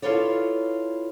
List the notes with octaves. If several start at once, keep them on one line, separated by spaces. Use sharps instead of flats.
E4 F4 A4 B4 C#5 D5